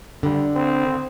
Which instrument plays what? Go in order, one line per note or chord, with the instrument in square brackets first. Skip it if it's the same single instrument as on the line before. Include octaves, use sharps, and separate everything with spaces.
[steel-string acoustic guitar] D3 [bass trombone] G3
[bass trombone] C4